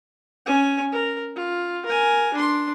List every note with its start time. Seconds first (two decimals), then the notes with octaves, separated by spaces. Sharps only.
0.46 C#4 G#5
0.92 A#4
1.36 F4
1.86 A#4 G#5
2.33 D4 C6